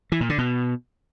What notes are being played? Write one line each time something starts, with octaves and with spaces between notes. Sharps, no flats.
E3
A#2
D3
B2